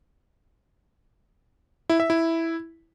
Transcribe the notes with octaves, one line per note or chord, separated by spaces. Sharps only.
E4
E5
E4